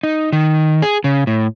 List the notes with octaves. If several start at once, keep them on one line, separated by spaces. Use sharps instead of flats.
D#4
D#3
G#4
C#3
A2